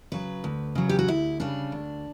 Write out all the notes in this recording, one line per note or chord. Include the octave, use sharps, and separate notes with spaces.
C#3 F#3 B4
D2
C#3 F#3
G4
F#4
D2 E4
C#3 G3 D4
D2